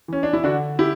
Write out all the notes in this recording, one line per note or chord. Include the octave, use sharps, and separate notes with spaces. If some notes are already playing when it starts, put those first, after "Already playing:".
E3 C#4
D4
E4
D3 D4 F#4
E4 G4